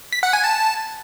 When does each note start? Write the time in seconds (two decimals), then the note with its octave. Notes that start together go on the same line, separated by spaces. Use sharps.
0.13 B6
0.23 F#5
0.33 G#5
0.44 A5